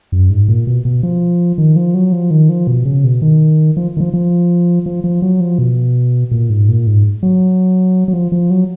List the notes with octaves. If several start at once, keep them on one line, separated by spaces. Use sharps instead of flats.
F#2
G#2
A#2
B2
B2
F3
D#3
F3
F#3
F3
D#3
F3
B2
C#3
B2
D#3
F3
D#3
F3
F3
F3
F3
F#3
F3
B2
A#2
G#2
A#2
G#2
F#3
F#3
F3
F3
F#3